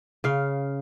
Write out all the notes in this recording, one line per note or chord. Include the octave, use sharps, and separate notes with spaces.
C#3 F5